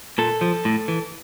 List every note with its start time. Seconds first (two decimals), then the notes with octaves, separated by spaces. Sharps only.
0.18 A#2 A4
0.41 F3
0.65 A2
0.88 E3